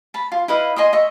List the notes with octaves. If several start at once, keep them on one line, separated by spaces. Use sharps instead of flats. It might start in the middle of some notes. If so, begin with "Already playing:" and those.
A5 B5
F4
E4 B4 D#5 F5
D#5 G#5 C6 D#6
D#5 E5 C#6